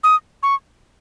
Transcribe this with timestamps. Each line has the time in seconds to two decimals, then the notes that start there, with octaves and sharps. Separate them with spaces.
0.04 D#6
0.43 C#6